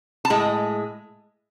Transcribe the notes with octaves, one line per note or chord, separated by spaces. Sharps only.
A5
A2 G#3